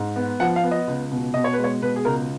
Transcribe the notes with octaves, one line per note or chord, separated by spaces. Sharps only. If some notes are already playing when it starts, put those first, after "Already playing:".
Already playing: G#2
B3
F3 F#5
F5
B3
D#5
C#2
B2
B2 D#5
C#5
B4
G#3
C#5
B2 B4
G#4
C#2 A#4